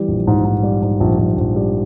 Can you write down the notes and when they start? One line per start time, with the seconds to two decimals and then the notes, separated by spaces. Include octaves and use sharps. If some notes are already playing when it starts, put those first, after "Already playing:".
Already playing: E3 G3
0.08 A#1
0.27 G#2
0.45 G#2
0.63 G3
0.82 G#2
1.00 A#1
1.19 A#1
1.37 A#1
1.56 G3